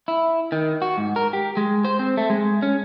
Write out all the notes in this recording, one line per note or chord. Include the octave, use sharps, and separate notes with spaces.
E4
D#3
F#4
G#2
A#4
G4
G#3
C5
C4
A3
G#3
C#4